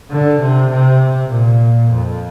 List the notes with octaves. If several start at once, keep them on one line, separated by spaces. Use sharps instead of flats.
D3
C3
C3
A#2
F2